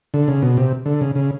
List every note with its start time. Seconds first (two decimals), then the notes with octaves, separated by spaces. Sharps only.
0.14 D3
0.28 C#3
0.42 B2
0.57 C3
0.86 D3
1.01 C#3
1.15 C#3